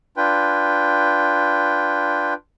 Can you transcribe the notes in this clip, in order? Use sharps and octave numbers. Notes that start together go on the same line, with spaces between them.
D4 F4 B4 G5